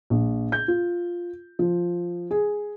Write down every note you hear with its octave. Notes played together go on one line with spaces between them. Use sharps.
A#1
G6
F4
F3
G#4